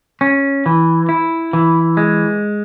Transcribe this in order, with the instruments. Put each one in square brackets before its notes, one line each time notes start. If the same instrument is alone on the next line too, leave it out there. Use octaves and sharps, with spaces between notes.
[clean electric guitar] C#4
E3
E4
E3
G#3